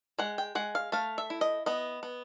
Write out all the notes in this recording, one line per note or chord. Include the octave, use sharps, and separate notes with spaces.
G#3 F#5
G5
G#3 F#5
F5
A3 F5
E5
E4
D#5
B3 D#5
B3